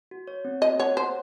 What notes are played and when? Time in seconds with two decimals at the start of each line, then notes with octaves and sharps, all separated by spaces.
0.11 F#4
0.27 C#5
0.45 C4
0.62 F#4 D#5
0.80 C#5 F#5
0.96 C5 C#5